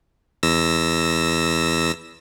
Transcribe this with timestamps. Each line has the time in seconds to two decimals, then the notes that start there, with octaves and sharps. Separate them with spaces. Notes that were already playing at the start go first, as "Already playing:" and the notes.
0.43 E2 E6 A#6